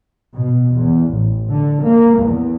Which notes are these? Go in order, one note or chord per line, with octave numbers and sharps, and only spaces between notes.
B2
E2
A1
D3
A#3
E2